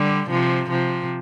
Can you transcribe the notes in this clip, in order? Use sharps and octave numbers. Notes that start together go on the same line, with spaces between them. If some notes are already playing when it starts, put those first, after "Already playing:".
Already playing: D3 G3
C3 F3
C3 F3